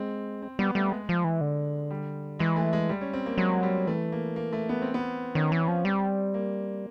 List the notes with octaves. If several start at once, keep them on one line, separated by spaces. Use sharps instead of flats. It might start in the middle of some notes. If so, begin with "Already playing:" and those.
Already playing: G#3 C4
C4
G3 B3
G3 A3
G#3
F3
E3
D3
G3
E3 G#3
A3
G#3
G3
C#4
C4
A#3
F#3 G#3
G3
E3 A3
A#3
A#3
A3
B3
C4
B3
D#3 C#4
E3
C#4
F3
G3 C4
A#3